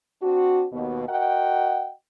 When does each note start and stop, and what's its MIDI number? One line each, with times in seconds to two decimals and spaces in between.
0.22 0.66 60
0.22 0.66 62
0.22 0.66 66
0.71 1.04 39
0.71 1.04 47
1.08 1.91 66
1.08 1.91 70
1.08 1.91 75
1.08 1.91 78
1.08 1.91 79